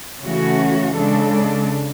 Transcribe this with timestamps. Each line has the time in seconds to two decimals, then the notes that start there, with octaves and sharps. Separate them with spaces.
0.24 C#3 E3 A3 C#4 F#4
0.96 C#3 G#3 D4 A4